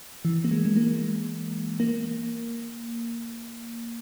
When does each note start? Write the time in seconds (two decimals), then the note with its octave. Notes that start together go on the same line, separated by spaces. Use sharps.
0.25 E3
0.44 A#3
0.51 G#3
0.65 G#3
0.76 A#3
1.80 A#3